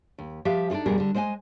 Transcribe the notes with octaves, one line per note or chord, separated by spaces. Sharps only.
D#2
F3 G4 E5 F5
D4 D#4 F4 G#4 A4
F2 B2 G3 G#4 A#4
D3 G3
G#3 C5 D#5 G5 G#5